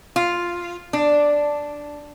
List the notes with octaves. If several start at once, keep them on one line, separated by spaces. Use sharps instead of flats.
F4
D4